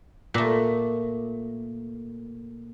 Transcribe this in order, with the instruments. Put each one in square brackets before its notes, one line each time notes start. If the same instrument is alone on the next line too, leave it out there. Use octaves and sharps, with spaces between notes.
[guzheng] A#2 A3